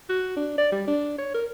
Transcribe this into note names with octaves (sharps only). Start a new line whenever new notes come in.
F#4
D4
D5
G3
D4
C#5
A#4